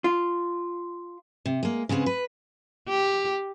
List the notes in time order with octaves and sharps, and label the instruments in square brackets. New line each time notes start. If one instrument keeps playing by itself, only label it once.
[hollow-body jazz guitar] F4
[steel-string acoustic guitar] C3
G#3 A#3
C#3 G#3 B3 C4
B4
[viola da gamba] G4